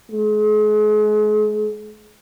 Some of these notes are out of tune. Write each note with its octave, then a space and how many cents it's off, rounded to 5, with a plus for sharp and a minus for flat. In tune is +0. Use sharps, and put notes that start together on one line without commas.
G#3 +40